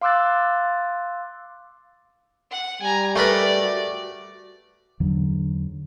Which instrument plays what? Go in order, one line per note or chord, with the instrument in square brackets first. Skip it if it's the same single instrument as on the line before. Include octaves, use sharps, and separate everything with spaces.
[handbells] F5 C6 D6 E6 F#6 A6
[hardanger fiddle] F#5
[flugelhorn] G3 [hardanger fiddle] G#5 A#5
[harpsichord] A3 A#4 B4 [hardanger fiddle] D5
[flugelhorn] F#4
[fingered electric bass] E2 D3 F#3